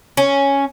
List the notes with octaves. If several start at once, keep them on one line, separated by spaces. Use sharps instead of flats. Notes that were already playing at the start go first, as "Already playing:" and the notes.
C#4